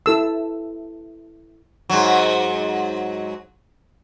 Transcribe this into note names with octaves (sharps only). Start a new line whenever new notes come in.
E4 A4 E6
G#2 F#3